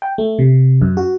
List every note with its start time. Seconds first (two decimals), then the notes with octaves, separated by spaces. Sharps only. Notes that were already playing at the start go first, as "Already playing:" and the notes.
0.02 G5
0.18 A3
0.39 C3
0.82 F#2
0.97 F#4